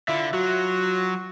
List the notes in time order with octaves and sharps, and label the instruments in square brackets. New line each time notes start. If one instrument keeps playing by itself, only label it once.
[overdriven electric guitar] D3 [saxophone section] E4 F4 E5
[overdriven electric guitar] F#3 [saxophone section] F4 F#4